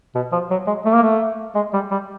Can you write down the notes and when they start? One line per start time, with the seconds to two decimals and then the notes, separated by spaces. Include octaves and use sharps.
0.15 B2
0.32 F3
0.51 F#3
0.67 G#3
0.85 A3
0.94 A#3
1.03 A3
1.55 G#3
1.74 G3
1.91 G3